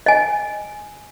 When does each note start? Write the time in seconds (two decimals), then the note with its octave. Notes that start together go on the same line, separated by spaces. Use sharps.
0.06 D#5 G#5